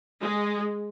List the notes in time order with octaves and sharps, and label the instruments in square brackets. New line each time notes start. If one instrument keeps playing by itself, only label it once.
[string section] G#3